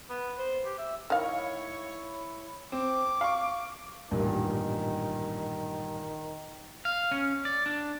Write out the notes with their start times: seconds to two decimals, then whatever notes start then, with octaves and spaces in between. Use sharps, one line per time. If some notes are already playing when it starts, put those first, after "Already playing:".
0.09 B3
0.38 C5
0.65 G4
0.78 E5
1.10 D#3 E4 C#5 F5
2.72 C4 D6
3.21 F5 C#6
4.11 A1 G2 A#2 D#3
6.85 F5
7.11 C#4
7.45 D5
7.66 D4